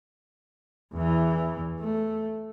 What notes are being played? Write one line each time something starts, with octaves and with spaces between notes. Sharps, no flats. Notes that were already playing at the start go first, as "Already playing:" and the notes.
E2 E3
A3